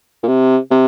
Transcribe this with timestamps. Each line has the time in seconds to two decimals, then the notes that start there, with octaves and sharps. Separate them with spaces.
0.23 A#2
0.28 C3
0.71 C3